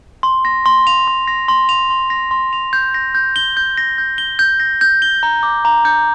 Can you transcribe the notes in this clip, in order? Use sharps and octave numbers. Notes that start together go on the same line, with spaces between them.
C6
A#6
C6
F7
C6
A#6
C6
F7
C6
A#6
C6
F7
G6
A#6
G6
G7
G6
A#6
G6
G7
G6
A#6
G6
G7
A#5
D6
A#5
G6